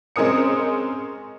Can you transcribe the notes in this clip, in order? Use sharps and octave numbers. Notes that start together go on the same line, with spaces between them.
G#3 C4 C#4 A#4 D#6 C#7